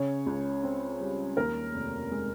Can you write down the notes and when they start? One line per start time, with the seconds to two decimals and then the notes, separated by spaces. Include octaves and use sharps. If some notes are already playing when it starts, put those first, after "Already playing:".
Already playing: C#3 C#5
0.26 C#2
0.63 C4
1.00 G3
1.37 D#2 A#4
1.73 F1
2.11 G#3